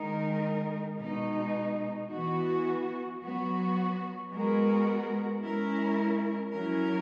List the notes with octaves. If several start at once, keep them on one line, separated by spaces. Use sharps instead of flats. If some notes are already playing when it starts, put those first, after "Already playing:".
Already playing: D#3 G#3 D#4 A#4
B2 G#3 D#4
E3 B3 F#4
F#3 B3 F#4
G#3 B3 F#4 A#4
G#3 C#4 E4 A#4
F#3 C#4 E4 A#4